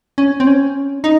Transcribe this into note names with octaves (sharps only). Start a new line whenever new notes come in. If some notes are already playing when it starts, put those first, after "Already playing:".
C#4
C4
C#4
D#4